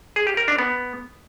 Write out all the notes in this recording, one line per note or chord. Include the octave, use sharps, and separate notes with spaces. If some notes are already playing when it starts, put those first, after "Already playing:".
G#4
G4
A#4
D4
B3